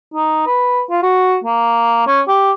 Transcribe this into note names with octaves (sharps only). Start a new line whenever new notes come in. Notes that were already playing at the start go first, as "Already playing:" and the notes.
D#4
B4
F4
F#4
A#3
C#4
G4